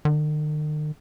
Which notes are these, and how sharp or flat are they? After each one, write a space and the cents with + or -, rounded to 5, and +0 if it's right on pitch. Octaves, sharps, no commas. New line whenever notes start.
D#3 -45